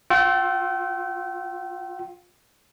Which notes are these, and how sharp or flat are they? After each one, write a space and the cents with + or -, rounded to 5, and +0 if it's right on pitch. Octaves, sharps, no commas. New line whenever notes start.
F4 +25 G5 -35 E6 +0